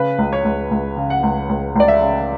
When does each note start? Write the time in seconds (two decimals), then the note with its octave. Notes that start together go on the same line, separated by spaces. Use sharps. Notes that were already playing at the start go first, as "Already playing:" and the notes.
Already playing: C#3 B4
0.19 C#2
0.33 C#5
0.45 C#2
0.71 C#2
0.97 C#3
1.10 F#5
1.23 C#2
1.49 C#2
1.76 C#2 D5
1.88 E5
2.02 C#3